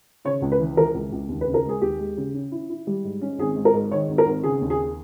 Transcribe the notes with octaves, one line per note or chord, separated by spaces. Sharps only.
C#3 C#5
C#2
B4
E3
E3 A#4
C#2
C#2
D#2
B4
C#3
A#4
G#3 G#4
D#2 G4
G#3
C#3
C#4
E4
E4
G3
G#2
C#4
G#1 G#4
G#2
A#4
G#2
D#3 C#5
G#1
A#4
G#1
C#3 G#4
D#2
G#4